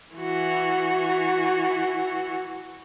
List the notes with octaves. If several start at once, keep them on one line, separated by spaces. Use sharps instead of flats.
E3 F#4